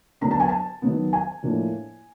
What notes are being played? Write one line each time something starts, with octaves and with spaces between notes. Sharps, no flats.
D3 F#3 B3 D4 A#5
A5
G#5
A5
D#3 F#3 B3
G#5
A2 F3 A#3 D4